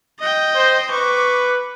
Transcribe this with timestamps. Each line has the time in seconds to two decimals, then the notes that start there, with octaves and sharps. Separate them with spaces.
0.20 D#5 G5
0.56 C5
0.91 B4 C#6 D6